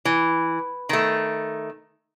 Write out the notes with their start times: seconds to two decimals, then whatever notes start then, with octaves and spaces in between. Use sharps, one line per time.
0.05 E3
0.89 D#3 A3